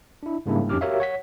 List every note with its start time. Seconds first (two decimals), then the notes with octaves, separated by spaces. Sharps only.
0.23 D4 E4
0.46 G#2 C#3 G3 A#3 D4 E4
0.69 F2 C#4 D#4 G4 D6 F6
0.81 F#4 G4 A#4 C#5 E5 F5
1.00 C#5 F#5 B6